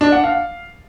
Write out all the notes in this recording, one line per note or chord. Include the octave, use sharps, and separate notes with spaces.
D4
F#5
F5